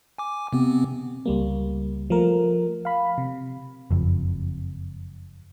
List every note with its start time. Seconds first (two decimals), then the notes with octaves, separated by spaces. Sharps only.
0.18 G#5 D6
0.53 C3 B3 C4
1.26 C#2 G3 A#3
2.10 F3 A3 A#4
2.85 F5 B5
3.18 C3
3.91 F#1 F2